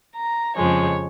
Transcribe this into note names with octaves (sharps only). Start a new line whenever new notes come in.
A#5
F2 C#3 F3 G#3 C#5